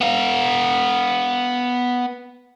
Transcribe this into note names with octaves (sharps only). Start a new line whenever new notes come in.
B3 F5